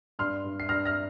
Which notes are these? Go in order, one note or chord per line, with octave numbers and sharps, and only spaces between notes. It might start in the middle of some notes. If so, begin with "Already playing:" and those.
G2 C6 F6
G2
C7
G2 F6 A#6
F6 A#6